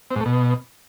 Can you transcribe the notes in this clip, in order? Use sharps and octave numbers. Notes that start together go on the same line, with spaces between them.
C4
G#2
A3
B2